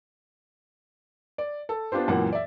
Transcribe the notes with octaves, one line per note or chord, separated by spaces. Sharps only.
D5
A4
B3 D4 F4 G4 C5
C#2 F#2 A#2 E3 A#3 F#5
D5 E5